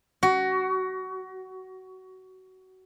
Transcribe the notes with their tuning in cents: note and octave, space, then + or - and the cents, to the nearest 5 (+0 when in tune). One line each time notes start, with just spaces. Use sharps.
F#4 +20